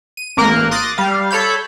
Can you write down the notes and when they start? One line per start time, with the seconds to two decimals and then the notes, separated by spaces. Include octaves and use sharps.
0.17 D#7
0.37 A1 A#3 A#4 F#6
0.71 C6 D6 D#6 F#6 A6 A#6
0.98 G3 F5
1.31 A4 C#5 B5 G6